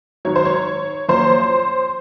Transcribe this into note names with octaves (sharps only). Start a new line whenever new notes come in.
G#2 D#3 F#3 C#5
C5
C#5
F#2 F3 A#3 C#4 C5